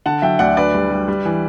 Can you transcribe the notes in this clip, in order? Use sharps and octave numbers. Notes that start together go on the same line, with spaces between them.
D3 F#5 A5
F#3 E5 G5
D2 D5 F#5
D4 B4 D5
G3
G3
G3
E3